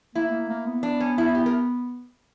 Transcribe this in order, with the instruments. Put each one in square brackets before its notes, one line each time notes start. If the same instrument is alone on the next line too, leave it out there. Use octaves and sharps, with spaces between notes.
[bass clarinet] A#3 [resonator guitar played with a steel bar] E4
[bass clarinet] A#3
A#3
B3
[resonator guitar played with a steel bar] D4
C#4
E4
G4
A#4